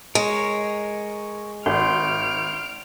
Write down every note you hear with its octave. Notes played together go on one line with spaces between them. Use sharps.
G#3 A#4 C#5
G#1 C6 F6 D7